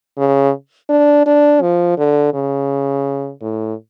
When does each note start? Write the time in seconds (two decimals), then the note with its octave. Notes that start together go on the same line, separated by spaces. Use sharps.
0.18 C#3
0.89 D4
1.26 D4
1.62 F3
1.98 D3
2.34 C#3
3.41 A2